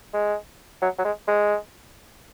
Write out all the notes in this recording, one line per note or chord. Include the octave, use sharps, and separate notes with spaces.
G#3
F#3
F#3
G#3
G#3